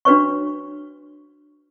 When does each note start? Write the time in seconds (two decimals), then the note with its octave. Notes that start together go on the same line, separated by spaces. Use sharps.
0.05 D4 F#4 B4 C#5 C#6